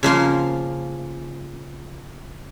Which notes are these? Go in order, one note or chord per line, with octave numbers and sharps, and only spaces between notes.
C#3 F3 A#3 C6